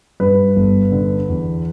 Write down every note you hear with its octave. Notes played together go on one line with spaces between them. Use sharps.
G2 B4
G1
D3
E2